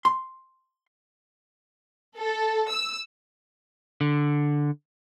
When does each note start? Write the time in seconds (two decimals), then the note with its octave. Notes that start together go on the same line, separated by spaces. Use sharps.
0.05 C6
2.20 A4
2.70 E6
4.01 D3